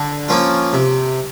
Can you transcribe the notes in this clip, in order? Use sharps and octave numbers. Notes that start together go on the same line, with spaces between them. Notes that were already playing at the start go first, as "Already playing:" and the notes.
Already playing: D3
F3 A#3 C#4 F4
C3